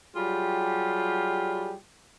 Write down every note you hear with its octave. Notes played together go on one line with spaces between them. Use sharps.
F#3 G3 F4 G4 G#4